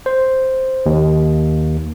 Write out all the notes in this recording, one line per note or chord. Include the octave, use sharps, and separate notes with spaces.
C5
D#2